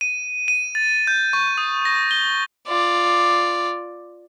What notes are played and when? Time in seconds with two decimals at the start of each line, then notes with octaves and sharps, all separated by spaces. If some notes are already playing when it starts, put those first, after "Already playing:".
0.01 D#7
0.48 D#7
0.75 A6
1.07 G6
1.33 C#6
1.58 D#6
1.85 A#6
2.11 G7
2.68 F4 D5